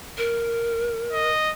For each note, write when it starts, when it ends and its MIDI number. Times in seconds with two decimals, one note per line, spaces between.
0.18 1.30 70
1.13 1.51 75